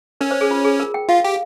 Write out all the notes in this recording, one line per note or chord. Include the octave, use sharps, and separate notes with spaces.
C#4 A#4
C5
G#4
F4
G#4
A#4
G5
F4 F5
G4